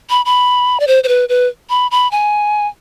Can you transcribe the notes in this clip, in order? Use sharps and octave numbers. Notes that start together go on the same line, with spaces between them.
B5
B5
D5
C5
C5
B4
B4
B5
B5
G#5